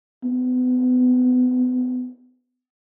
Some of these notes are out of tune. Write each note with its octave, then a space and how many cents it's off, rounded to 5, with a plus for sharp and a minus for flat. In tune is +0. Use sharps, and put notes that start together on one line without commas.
B3 +30